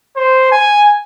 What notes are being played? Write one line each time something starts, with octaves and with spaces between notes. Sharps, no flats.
C5
G#5